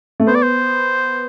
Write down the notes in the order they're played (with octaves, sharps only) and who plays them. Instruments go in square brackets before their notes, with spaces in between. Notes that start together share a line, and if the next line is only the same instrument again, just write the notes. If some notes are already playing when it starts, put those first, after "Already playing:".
[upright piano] A3
[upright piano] B3 [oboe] C5
[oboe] D5
C5